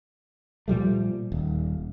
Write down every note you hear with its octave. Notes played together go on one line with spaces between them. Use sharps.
A#2 F3 G3 A3
D#1